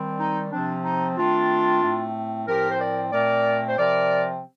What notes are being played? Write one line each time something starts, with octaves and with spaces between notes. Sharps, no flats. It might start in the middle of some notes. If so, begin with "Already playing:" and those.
Already playing: D#3 G3 C4
D#4
C3 F3 C4 D4
D#4
D#3 A3 C4 D4 F4
A2 A3 C4
A2 F3 C4 G4 A#4
C5
A#4 D5
A#2 A3 C4 A#4 D5
C5
C3 F3 C4 A#4 D5